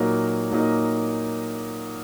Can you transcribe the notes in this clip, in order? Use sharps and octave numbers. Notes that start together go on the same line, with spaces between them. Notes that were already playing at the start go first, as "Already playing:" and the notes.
Already playing: A#2 F#3 A#3 D#4 A#4
A#2 F#3 A#3 D#4 A#4